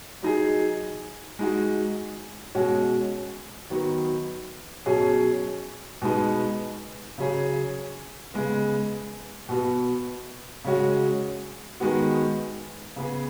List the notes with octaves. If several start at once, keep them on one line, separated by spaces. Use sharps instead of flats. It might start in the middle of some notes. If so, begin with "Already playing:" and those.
F#3 D#4 G#4
G#3 D#4 F#4
B2 G#3 C#4 F#4
D#3 F#3 B3 F#4
B2 F#3 C#4 G#4
B2 G#3 B3 D#4
C#3 F#3 C#4 G#4
C#3 G#3 B3
B2 B3 F#4
C#3 G#3 C#4 F#4
D#3 G#3 B3 F#4
C#3 B3 G#4